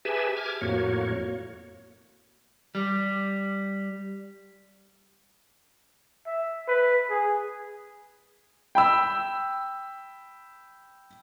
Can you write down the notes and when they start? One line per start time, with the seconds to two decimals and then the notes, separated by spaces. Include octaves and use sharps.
0.05 G4 G#4 B4 E5 G#5 A5
0.37 D6 F6 G#6
0.61 F2 A2 A#3 F#4 C#5
2.75 G3
6.27 E5
6.68 B4
7.10 G#4
8.75 G5 B5 E6